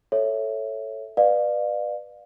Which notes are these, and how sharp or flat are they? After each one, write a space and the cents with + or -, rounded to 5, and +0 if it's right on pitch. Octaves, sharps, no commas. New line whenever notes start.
A4 +0 C#5 -5 E5 +0
B4 +0 D5 +35 F5 +15